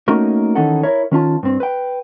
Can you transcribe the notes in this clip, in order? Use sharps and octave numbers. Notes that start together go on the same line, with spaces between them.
A3 A#3 C#4 D#4 F#4 A#4
D#3 E3 C#4 D#4 A4 F#5
E4 A#4 C#5
D#3 C#4 F4 A5
G2 C4
B4 G5